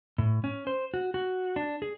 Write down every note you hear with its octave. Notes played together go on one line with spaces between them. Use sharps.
A2
C#4
C5
F#4
F#4
D4
G#4